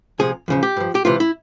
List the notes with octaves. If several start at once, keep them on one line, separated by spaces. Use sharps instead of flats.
C2 C3 F3 G#4
E2 C#3 F3
G4
G2 F3
G4
C#2 C3 E3 F4
E4